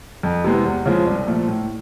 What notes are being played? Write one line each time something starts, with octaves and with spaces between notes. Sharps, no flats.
F2
C3 E3 G#3 B3
E2
C#3 F3 G#3
C2
A#2 F3 A3
A2